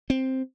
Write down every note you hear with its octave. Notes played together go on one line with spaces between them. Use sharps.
C4